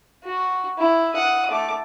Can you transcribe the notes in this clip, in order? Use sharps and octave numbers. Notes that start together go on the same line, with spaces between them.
F#4
E4
F#5 D#6
A3 D6